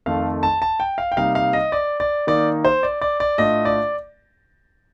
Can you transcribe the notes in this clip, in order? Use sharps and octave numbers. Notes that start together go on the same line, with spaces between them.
F2 D#3 A3 F5
A5
A5
G5
F5
G5
C3 G3 A#3 D#4 F5
F5
D#5
D5
D5
D#3 A#3 D#4 D5
C5
D5
D5
D5
A2 A3 D4 F4 D#5
D5